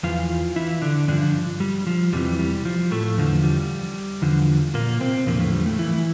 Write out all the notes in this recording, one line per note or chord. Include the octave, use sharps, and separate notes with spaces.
E2 E3 F3 F4
E3 E4
D3 D4
G2 D3 F3 D4
G3
F3
E2 C3 E3 G3
G3
F3
A2 A3
E2 D3 F3
G3
E2 D3 F3
A#2 A#3
C3 C4
E2 A#2 D3 F3 A#3
A2 A3
G3
A2 A3
E3 E4